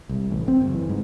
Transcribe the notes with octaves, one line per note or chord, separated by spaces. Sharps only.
C2
A1
C4
F#1
E3
G#2